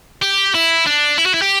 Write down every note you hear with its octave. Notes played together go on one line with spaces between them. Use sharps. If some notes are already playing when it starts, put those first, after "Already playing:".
G4
E4
D4
E4
F#4
E4
G4